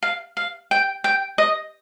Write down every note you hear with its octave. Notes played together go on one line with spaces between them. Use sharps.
F5
F5
G5
G5
D#5